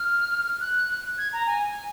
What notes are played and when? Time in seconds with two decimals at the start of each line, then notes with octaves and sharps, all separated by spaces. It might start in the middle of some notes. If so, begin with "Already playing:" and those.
Already playing: F6
0.60 F#6
1.18 G#6
1.33 A#5
1.47 G#5